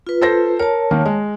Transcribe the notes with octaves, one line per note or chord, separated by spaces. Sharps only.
F4 B4
A4 C5 A#6
A#4 C#5 A5
D#3 A#3
G#3